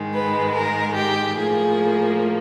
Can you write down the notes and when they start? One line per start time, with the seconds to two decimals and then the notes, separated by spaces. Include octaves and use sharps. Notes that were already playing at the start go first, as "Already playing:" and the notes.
Already playing: G#2 D#3 G#3
0.12 B4
0.54 A#4
0.95 G4
1.37 A2 F3 A#3 G#4